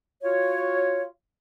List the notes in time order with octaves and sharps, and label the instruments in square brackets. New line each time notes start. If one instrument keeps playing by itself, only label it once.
[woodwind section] F4 F#4 C#5